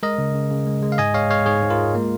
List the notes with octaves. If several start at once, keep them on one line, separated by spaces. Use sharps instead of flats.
G#3 A#4 D#5
C#3
C#3
C#3
G#3
G#3
F5
G#2 D#5 G#5
G#3 C#5 F5
G#3 C#5 F5
G#2 G#4 C#5
G#2
F4 A#4
G#3
A#3